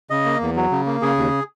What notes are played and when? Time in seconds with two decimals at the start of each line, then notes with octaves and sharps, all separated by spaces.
0.10 C#3 D#5
0.25 A#3
0.41 E2
0.56 F#3
0.71 C#3
0.86 A#3
1.02 C#3 G#4
1.18 D#2